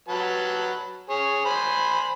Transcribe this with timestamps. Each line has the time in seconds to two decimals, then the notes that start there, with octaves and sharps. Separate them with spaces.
0.09 F#3 B4 A5
1.10 G#4 C#5
1.45 C5 G#5 B5